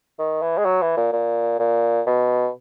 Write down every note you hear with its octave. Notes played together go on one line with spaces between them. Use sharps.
D#3
E3
G#3
F#3
E3
A#2
A#2
A#2
B2